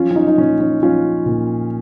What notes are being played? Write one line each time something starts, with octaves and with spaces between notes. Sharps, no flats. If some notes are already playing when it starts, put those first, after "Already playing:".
Already playing: F3 C#4 F4
C#4
D#4
D#4
A#2 C#4
C#4
F3 C#4 F4
A#2